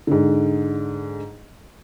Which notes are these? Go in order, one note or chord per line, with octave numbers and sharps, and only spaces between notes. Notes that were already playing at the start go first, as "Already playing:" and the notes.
G#2 D3